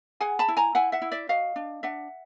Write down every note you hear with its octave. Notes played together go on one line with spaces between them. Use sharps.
G#4 F#5 G#5
A5 B5
E4
G#5 A#5
E4 F#5 G#5
E5 F#5
E4
D5 E5
F#4 D#5 F5
D4
D4 E5 F#5